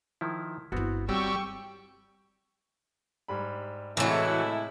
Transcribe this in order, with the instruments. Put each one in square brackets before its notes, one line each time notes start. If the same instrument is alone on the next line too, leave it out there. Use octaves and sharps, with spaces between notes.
[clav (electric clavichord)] D#3 F3 E4
[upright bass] G1 E4 [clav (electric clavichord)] B3 C4 F#4
[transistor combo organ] G3 [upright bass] C4 [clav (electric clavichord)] F#4 C#5 [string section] G5 C#6 E6
[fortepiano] G#2 G3 B5
[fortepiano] A2 C3 [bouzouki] E3 F#3 [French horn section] G#3 A3 E4